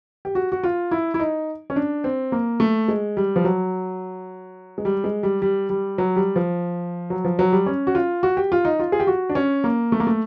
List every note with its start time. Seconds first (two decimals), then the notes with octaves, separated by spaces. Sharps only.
0.25 G4
0.35 F#4
0.52 F#4
0.64 F4
0.91 E4
1.14 E4
1.20 D#4
1.70 C#4
1.76 D4
2.04 C4
2.32 A#3
2.60 A3
2.88 G#3
3.17 G3
3.36 F3
3.45 F#3
4.78 G#3
4.85 G3
5.04 G#3
5.23 G3
5.42 G3
5.70 G3
5.98 F#3
6.16 G3
6.36 F3
7.10 F#3
7.25 F3
7.39 F#3
7.52 G3
7.66 C#4
7.87 F#4
7.95 F4
8.23 F#4
8.37 G4
8.52 F4
8.65 D#4
8.80 F4
8.92 G#4
9.00 G4
9.07 F#4
9.29 D4
9.35 C#4
9.64 A#3
9.92 A3
10.00 A#3
10.07 A3